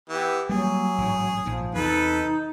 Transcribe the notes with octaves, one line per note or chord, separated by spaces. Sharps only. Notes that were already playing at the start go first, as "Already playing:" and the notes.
E3 B3 G4
F#3 G3 A3 A#3 G#4
A1 G#2
A#1 G#2 F3
E2 C3 D#4 A4 B4